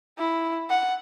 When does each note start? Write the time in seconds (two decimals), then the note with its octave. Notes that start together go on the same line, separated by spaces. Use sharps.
0.19 E4
0.70 F#5